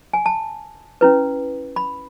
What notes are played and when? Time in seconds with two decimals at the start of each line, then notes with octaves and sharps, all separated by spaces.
0.13 G#5
0.26 A5
1.01 C#4 E4 B4
1.76 B5